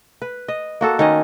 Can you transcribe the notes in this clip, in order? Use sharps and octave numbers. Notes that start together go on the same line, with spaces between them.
B4
D#5
A#3 F#4 A4
D#3 C#4 D#5